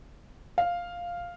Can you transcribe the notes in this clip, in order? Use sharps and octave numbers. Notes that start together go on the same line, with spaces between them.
F5